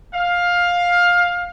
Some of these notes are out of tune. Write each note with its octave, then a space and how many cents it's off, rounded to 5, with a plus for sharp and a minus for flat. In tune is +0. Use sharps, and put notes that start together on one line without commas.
F5 +15